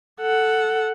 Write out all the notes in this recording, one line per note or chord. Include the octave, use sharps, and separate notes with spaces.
A4 F#5